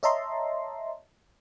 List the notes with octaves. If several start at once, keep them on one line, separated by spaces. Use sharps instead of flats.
C#5 D#5 E5 A5 A#5 C6